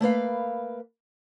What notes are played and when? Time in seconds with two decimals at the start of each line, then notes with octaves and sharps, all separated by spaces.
0.01 A3 A#3 B4 F5